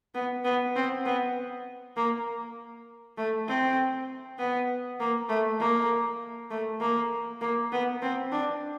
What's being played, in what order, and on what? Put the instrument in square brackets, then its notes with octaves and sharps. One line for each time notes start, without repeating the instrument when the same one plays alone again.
[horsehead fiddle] B3
B3
C4
B3
A#3
A3
C4
B3
A#3
A3
A#3
A3
A#3
A#3
B3
C4
D4